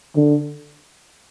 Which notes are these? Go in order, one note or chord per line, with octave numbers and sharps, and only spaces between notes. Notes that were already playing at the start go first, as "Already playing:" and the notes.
D3